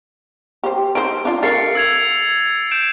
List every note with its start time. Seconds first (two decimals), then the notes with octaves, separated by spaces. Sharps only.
0.64 G4 C5
0.95 D#4 C5 D7
1.25 D4 F4
1.43 A4 A#4 F5 A6 C7 C#7
1.75 E6 G#6 F7
2.71 G6 D7 E7